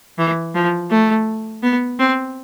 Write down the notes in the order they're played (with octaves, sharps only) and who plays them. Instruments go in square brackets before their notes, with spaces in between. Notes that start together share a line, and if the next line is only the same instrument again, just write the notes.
[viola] E3
F3
A3
B3
C4